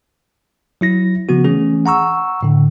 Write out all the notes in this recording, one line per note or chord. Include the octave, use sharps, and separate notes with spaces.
F#3 E4 A#6
C#3 F3 B3 F#4
E3 A3 C#4 G#4
F#5 A#5 C#6 E6
A2 D3